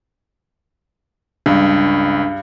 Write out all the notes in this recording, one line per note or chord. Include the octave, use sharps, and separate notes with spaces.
C#2 G2 D4